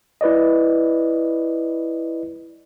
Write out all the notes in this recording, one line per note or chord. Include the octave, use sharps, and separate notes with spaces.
E4 B4 D5 D#5